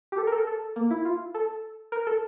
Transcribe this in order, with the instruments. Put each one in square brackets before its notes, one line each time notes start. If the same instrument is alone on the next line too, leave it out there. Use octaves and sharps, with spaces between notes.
[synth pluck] G4
A4
A#4
A4
A4
A#3
E4
F4
A4
A#4
A4